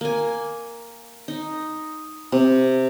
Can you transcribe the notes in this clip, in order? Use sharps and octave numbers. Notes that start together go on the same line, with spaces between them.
A#3 G#5
D#4
C3